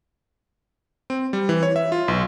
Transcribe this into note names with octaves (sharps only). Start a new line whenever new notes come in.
C4
G3
E3
C#5
E5
F4
B1